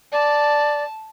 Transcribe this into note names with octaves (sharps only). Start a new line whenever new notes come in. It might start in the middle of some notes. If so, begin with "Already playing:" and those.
D5 A5